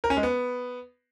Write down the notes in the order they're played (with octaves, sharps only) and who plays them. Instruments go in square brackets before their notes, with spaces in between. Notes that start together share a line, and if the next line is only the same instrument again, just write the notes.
[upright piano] A#4
C#4
G#3
B3